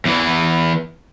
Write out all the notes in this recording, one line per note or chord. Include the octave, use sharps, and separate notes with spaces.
E2 E3